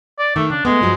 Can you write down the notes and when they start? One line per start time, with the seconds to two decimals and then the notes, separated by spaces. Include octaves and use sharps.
0.19 D5
0.36 D#3 A3
0.50 C#3 D4
0.65 G#3 A3 B3
0.81 G2 F3 F#3